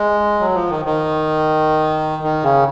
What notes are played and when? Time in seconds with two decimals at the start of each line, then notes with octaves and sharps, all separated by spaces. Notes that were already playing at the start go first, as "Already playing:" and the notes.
Already playing: G#3
0.40 F#3
0.55 F3
0.70 D#3
0.85 D#3
2.23 D#3
2.43 C#3